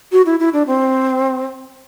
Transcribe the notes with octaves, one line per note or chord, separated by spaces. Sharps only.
F#4
E4
E4
D4
C4